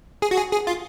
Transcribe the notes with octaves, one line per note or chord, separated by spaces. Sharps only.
G#4
F#4
G#4
G#4
F4